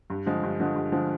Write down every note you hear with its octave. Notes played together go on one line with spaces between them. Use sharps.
G2
D3 F3 G#3
G2
D3 F3 G#3
G2
D3 F3 G#3